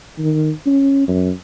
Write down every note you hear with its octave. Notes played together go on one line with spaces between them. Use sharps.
D#3
C#4
F#2